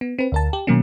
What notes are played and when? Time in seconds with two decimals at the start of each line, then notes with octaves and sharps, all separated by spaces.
0.01 B3
0.19 C4 B4
0.32 D2 A#4 A5
0.53 G4
0.67 B2 D#3 F#3 A#3 C#4